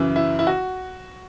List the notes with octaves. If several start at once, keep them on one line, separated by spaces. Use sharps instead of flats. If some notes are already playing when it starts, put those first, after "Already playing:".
Already playing: F#2 C#3 E3
E4
E4
F#4